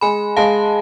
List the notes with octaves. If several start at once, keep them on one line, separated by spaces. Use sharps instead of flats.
G#3 G#5 B5
G#3 F5 A5